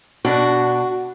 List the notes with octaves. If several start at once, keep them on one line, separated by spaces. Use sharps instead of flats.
B2 D4 F#4